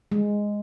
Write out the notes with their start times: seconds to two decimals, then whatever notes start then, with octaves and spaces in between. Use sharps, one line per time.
0.12 G#3